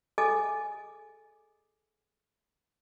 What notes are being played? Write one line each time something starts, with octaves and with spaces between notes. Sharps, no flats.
G#4 A4 D#5 G#5 D6